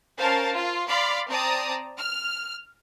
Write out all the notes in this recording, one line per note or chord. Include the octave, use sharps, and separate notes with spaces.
C#4 A#4 C5 F5 A5
F4
D5 F5 B5 C6 D6
C4 D5 A5 A#5 D#6
F6